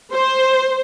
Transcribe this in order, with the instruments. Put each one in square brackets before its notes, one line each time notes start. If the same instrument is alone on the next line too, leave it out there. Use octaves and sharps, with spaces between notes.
[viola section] C5